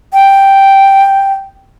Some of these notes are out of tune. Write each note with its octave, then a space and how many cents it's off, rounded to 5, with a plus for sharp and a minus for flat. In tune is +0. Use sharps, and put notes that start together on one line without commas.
G5 +0